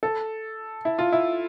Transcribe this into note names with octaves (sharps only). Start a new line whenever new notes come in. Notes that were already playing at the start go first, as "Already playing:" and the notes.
A4
E4
F4
E4